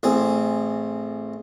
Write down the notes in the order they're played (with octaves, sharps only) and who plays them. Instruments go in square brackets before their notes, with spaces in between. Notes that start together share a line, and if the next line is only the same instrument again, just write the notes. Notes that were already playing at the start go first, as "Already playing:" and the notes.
[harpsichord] A1 C4 G#4